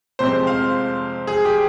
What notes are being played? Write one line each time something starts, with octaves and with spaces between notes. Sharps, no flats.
F2 C3 F3 G#3 C4 C5
F5
G#4
G4